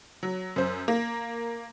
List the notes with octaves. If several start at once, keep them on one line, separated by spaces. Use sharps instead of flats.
F#3
F#2 C5
A#3